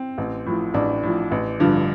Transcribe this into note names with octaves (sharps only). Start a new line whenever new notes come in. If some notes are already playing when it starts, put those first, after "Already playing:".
Already playing: C4
A1
A2 F3
A1 D4
A2 F3
A1
G2 D3 F3